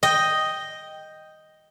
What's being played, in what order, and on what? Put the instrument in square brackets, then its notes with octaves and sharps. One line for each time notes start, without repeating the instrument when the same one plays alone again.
[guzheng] D#5 G5